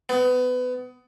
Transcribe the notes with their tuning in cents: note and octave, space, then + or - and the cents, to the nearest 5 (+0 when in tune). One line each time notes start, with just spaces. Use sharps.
B3 +25